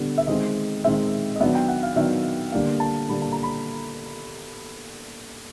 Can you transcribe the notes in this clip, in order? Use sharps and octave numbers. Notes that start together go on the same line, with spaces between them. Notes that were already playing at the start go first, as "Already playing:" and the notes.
Already playing: D3 G3 B3
E5
D#3 G#3 C4 D#5
D#3 G#3 C4 E5
D#5
D#3 F#3 B3 D4 E5
G5
F#5
F5
D#3 F#3 B3 D4 E5
D3 G3 A#3 D4 F5
A5
D3 G3 A#3 D4 B5
A5
A#5
B5